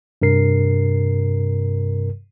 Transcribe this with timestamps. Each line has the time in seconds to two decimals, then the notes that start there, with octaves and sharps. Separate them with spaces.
0.22 G2 C3 A#4 C7